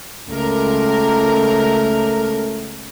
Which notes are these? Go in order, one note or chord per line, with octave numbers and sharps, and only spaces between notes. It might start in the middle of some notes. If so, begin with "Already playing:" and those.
C#2 A3 A#4